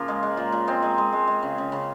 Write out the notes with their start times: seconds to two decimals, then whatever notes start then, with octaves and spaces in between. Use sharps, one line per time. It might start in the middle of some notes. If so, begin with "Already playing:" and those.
Already playing: C#3 F3 A#3 F4
0.08 G#3
0.23 G#3
0.37 A#2
0.52 A#2
0.67 G#3 C4
0.82 G#3
0.98 G#3
1.13 G#3
1.28 G#3
1.43 C#3
1.58 C#3
1.72 C#3